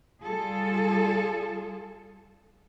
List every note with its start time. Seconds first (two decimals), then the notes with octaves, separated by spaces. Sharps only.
0.24 G3 F4 G#4 A4